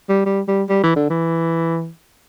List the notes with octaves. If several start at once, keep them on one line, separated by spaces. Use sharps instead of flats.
G3
G3
G3
G3
E3
D3
E3